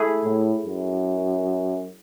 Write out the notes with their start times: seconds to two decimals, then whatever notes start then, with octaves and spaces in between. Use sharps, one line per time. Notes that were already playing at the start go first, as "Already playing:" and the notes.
Already playing: A3 E4 G#4
0.24 A2
0.66 F#2